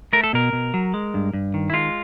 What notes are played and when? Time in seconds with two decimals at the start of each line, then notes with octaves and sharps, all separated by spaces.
0.13 A3 A#4
0.24 A4
0.33 B2 A#4
0.53 B2
0.74 F#3
0.94 G#3
1.14 G2
1.33 G2
1.54 D#3
1.70 E4
1.73 G#3 F4